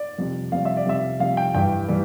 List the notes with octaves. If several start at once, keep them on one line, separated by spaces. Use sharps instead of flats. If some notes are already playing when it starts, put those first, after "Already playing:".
Already playing: D5
F2 C3 G3
F2 C3 G3 F5
E5
D5
F2 C3 G3 E5
F2 C3 G3 F5
G5
G2 E3 G3 G5
E3 G3